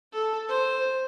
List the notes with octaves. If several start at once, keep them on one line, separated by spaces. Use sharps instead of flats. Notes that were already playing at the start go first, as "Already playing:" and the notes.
A4
C5